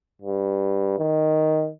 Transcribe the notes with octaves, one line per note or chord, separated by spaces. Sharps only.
G2
D#3